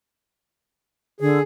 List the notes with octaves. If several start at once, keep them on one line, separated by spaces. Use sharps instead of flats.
D3 G#4